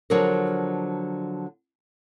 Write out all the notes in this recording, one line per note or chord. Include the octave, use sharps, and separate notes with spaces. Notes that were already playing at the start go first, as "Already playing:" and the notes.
D3 F3 F#3 D4 G#4 A#4